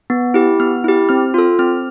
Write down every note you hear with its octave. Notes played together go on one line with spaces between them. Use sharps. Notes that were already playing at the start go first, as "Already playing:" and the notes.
B3
E4 G4
B3 F6
E4 G4
C4 F6
F4 A4
C4 F6